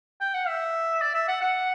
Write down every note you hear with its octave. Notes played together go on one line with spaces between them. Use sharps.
G5
F#5
E5
D5
E5
F#5
F#5